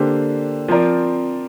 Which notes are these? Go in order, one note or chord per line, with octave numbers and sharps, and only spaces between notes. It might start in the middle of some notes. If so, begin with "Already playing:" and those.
Already playing: D3 A#3 D4 G4 C5
F3 C4 F4 A#4 D5